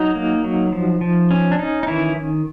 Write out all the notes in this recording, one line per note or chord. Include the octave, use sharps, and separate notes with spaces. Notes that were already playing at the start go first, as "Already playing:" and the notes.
Already playing: F#3 D#4
A#3
F#3
F3
F3
C#4
D4
C#4 D#4
D#4
D#3 E3 E4